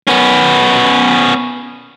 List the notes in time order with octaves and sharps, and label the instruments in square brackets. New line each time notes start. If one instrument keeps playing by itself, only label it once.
[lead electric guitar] B3 C#4